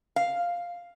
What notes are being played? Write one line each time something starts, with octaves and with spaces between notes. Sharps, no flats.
F5